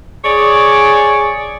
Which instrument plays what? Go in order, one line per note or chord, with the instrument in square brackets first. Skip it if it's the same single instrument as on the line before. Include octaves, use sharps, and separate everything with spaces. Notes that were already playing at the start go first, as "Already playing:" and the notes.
[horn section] G#4 C#5 D5